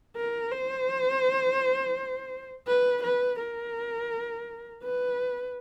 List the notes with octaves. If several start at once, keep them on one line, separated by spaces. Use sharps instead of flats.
A#4
C5
B4
B4
A#4
B4